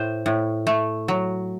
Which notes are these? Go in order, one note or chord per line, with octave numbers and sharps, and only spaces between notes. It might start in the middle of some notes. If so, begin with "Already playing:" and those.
Already playing: A2 C5
A2
A3
F#3